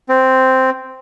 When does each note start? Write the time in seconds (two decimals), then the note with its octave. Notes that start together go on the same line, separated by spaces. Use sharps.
0.09 C4